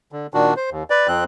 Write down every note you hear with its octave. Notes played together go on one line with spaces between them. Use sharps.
D3
A#2 D#3 D4 F#4
C5
D#2
B4 D5
F2 F3 C4 F#6